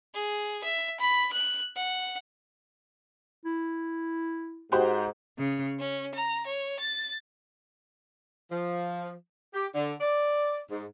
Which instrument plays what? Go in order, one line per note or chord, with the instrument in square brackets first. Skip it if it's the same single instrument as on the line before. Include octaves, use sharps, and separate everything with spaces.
[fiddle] G#4
E5
B5
F#6
F#5
[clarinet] E4
[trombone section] G#2 [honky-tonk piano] F#4 G4 C5
[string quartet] C#3
C#4
A#5
C#5
A6
[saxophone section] F3
G4
D3
D5
G#2